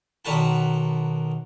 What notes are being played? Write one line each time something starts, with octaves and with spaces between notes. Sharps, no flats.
B1 D#3 F#4 B4 F#5 A5